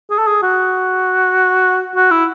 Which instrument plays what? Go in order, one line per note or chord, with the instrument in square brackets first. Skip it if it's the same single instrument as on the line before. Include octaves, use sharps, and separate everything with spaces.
[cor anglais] G#4
A4
G#4
F#4
F#4
E4